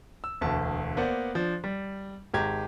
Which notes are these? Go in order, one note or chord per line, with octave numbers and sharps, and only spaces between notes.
E6
E1 D2 A5
A#3 B3 C5 D5 F#5
F3 D4
G3
G#1 G#3 G4 A#5 G#6